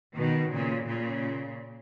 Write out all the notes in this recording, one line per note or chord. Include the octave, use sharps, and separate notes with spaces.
B2 D#3
A#2 C#3
A#2 C#3